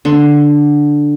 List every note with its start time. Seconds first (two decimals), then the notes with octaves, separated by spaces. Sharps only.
0.05 D3 C6 C#6